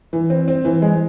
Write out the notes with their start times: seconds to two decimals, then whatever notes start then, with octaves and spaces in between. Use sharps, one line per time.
0.13 E3
0.30 C4
0.48 C4
0.65 E3
0.82 G#3